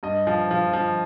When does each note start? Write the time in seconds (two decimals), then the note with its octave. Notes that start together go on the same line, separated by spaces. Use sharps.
0.03 G2 D#5
0.27 F3
0.51 F3
0.73 F3